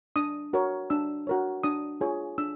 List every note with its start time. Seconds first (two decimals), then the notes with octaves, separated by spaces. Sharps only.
0.16 D4 D#6
0.53 F#4 A#4 C#5
0.90 D4 E6
1.27 F#4 A#4 C#5
1.64 D4 D#6
2.01 F4 G#4 C#5
2.38 D4 E6